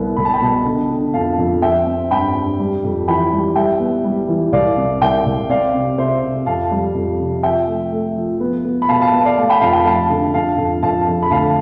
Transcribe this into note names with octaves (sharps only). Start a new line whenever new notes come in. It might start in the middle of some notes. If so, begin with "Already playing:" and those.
Already playing: C2 B3
C2 B5
A5
G5 B5
B2
D3
D3
F2 F5 A5
F2
C4 E5 G5
C4
G2 G5 B5
G2
G3
F2
E3 G5 B5
G3
G3 E5 G5
B3
G3
E3
C2 D5 F5
C3
C2 E5 G5
C2
C4 D5 F5
C3
C3 C5 E5
C3
F2 F5 A5
G3
F2
C3
F3 E5 G5
A3
A3
F3
B3
B3
B5
B2 F5 A5
F5 A5
B3
D5 F5
A3 F5 A5
G5 B5
F2 F5 A5
G5 B5
A3 F5 A5
D3
F2 F5 A5
F2
F2 F5 A5
F2
B5
D2 F5 A5